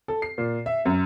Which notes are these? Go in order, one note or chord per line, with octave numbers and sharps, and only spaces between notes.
A4
C7
A#2
E5
F#2